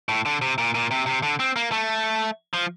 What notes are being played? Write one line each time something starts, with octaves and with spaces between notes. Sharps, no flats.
A2
D3
C3
A#2
A#2
C3
C3
D3
C4
A#3
A3
F3